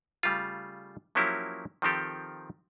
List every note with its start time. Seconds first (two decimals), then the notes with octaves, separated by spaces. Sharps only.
0.23 C#3 G3 A3 F4
1.15 F3 F#3 A#3 C#4 E4 G4
1.82 D#3 F3 C4 G4 A4